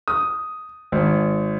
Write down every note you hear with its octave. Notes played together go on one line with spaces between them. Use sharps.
D#6
G#1